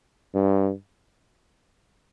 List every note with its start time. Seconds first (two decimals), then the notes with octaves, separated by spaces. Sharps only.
0.34 G2